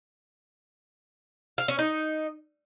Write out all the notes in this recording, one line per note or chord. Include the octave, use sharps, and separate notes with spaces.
F5
C#4
D#4